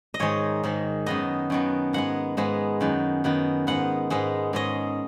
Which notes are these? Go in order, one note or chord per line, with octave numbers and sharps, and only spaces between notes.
D#5
G#2 D#3 G#3 C#5
G#2 D#3 G#3
F#2 D#3 B3 D#5
F#2 D#3 B3
G#2 G#3 B3 F#5
G#2 G#3 B3
F#2 D#3 B3
F#2 D#3 B3
G#2 G#3 B3 F#5
G#2 G#3 B3
G#2 G#3 C#4 D#5